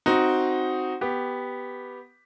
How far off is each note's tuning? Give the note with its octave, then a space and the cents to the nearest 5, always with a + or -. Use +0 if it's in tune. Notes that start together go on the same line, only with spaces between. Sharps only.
C4 +0 D#4 +5 F#4 +0
B3 +0 G4 +0